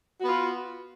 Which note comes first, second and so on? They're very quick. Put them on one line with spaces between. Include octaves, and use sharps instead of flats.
F#4 B3 F4